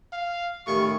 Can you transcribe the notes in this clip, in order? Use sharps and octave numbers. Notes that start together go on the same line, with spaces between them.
F5
A2 D#3 C#4 G4 C#6